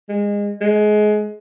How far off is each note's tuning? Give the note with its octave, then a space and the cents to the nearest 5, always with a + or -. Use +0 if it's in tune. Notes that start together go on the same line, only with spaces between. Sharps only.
G#3 -25
G#3 +25